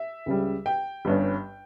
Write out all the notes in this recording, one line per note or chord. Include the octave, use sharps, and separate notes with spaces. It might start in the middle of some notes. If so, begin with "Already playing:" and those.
Already playing: E5
C#2 C#3 G3
G5
G1 G2 G3 C#4